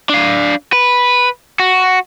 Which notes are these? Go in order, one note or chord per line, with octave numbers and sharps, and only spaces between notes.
D4 F5
B4
F#4